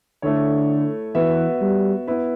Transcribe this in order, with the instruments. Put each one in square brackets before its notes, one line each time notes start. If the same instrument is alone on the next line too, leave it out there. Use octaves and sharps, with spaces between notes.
[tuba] D3 [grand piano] A3 E4 A4 C#5
[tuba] E3 [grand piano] B3 F#4 B4 E5
[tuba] G3
[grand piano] B3 E4 B4